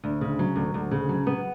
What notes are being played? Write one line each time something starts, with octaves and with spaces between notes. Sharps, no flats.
D2
C#3
F#3
D2
D2
C#3
F#3
B3